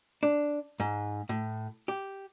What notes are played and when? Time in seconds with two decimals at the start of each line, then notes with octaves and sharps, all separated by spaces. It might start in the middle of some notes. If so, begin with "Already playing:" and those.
0.23 D4
0.80 G#2
1.29 A2
1.88 G4